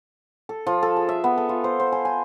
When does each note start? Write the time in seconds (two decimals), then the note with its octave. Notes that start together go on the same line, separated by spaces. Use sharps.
0.49 A4
0.67 F3
0.83 A4
0.96 G#4
1.09 E5
1.24 B3
1.38 A4
1.49 F4
1.64 C5
1.80 C5
1.92 G#5
2.05 G#5